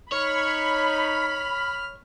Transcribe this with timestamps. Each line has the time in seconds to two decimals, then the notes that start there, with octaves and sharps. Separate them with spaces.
0.12 D#4 C#5 B5 F6